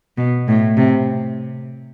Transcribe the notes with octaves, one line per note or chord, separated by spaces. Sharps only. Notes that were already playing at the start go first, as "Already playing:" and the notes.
B2
A2
C3